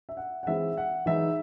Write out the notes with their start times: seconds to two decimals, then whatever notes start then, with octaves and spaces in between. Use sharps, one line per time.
0.09 E5
0.17 F#5
0.43 F#5
0.47 E3 G#3 C4 E4 E5
0.77 F#5
1.06 E3 G#3 D#4 E5